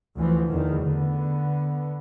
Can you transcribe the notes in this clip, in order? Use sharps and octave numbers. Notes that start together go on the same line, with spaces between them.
D2 E3 F3
E2 D#3
D3 B3